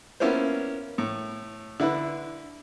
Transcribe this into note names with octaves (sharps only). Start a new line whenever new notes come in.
A#3 B3 C#4 E4 F4 C5
A2
D3 E4 B4